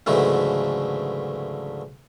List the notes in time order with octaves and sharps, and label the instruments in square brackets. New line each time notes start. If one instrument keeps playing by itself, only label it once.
[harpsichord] C#2 G#2 D3 E3 F#3 A3